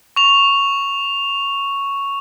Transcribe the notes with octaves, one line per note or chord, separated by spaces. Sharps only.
C#6 F7